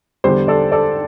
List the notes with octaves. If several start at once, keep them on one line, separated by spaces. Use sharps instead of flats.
E2 D3 G3 G4 C5
A4 D5
A4 D5